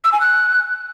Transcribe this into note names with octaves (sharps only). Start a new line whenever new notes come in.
E6
G#5
F#6